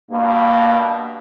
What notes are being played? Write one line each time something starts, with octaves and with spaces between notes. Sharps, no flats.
G2 B2 A#3